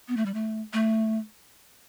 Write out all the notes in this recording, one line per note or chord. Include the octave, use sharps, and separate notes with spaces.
B3
A3
G3
A3
A3